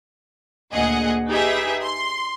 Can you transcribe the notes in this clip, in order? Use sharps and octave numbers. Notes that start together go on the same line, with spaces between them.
D2 A#2 G#4 D#5 F#5
D#4 G4 G#4 B4 E5
C6